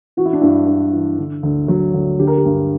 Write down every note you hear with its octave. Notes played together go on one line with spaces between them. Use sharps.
E3 F#4
E4
D4
G2 E4
G2
E3
D3
D2
F#3
D2
D3 G4
A#4
G4
G2